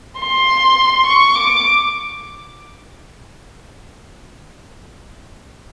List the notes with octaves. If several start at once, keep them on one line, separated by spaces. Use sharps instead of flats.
C6
C#6
D6